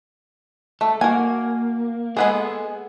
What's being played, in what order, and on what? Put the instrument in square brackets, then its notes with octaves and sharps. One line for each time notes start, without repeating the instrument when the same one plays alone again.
[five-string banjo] A3 [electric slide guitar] A4
[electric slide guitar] A#3 [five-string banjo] F#4 G#5
[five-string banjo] G#3 B3 G#4 [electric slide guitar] A4 G#5